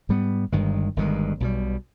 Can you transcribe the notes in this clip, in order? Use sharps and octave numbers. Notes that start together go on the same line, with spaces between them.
G#2 G3 B3
G1 G2 D#3 G#3
G1 G2 D#3 G#3
B1 B2 G3